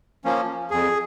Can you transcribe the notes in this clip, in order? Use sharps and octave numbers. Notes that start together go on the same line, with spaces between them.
F3 A#3 C#4
F2 G#4